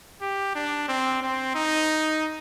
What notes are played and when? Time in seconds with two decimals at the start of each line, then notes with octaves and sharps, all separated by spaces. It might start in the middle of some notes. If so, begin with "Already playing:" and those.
0.21 G4
0.55 D4
0.88 C4
1.22 C4
1.55 D#4